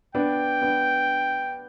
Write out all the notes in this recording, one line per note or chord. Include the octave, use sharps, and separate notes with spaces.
B3 D4 G5
B3 D4